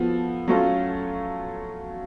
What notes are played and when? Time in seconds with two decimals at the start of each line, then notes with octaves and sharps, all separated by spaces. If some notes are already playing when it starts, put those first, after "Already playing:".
Already playing: F3 B3 F#4 A4
0.48 F#3 A3 C#4 F4 A4